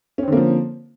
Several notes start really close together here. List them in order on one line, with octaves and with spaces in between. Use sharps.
C#4 C4 D3 A#3 F3